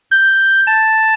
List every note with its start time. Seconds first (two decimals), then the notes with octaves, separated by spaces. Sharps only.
0.11 G6
0.67 A5